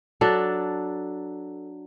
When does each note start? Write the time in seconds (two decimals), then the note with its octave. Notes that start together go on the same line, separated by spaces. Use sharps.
0.21 F#3 D4 A4